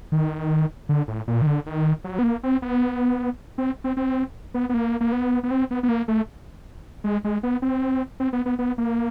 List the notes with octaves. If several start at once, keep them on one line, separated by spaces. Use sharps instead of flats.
D#3
D3
A2
A#2
D#3
D3
D#3
F#3
B3
A#3
C4
B3
C4
C4
C4
B3
B3
A#3
A#3
B3
B3
C4
B3
B3
A#3
A3
G#3
G#3
B3
C4
C4
B3
B3
B3
A#3